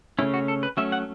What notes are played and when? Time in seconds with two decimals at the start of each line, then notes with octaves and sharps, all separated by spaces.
0.19 C#3 A3 C#4 E4
0.34 F#4
0.48 A4
0.63 B4
0.77 F#3 A3 C#4 E5
0.92 F#5